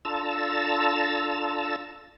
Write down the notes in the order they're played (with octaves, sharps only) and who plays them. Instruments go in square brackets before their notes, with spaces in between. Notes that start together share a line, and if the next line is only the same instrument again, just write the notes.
[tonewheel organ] D4 F4 A4 A#5 E6 A6